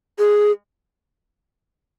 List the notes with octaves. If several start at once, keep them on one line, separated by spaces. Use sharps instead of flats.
G#4